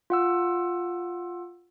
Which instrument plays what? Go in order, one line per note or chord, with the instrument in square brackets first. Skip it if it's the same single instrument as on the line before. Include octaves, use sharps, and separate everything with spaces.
[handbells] F4 F#5 E6